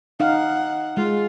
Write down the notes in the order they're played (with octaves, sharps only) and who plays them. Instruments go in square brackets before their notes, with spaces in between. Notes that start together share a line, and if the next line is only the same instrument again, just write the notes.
[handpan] D#4 F5 [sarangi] F#5
[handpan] G#3 [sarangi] F4